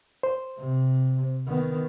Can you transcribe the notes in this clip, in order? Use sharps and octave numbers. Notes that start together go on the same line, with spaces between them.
C5
C3
D#3 B3